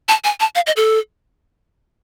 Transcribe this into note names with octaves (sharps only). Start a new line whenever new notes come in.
A5
G#5
A5
F5
D#5
A4